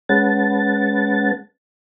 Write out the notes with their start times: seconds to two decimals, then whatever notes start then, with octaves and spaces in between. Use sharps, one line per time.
0.09 G#3 C#4 B4 F#5 A5 A6